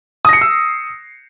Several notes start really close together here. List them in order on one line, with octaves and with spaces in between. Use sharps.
D#6 A#6 C#7 C7 E6